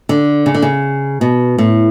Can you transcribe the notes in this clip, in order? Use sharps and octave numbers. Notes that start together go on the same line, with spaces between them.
D3
C#3
D3
C#3
B2
A2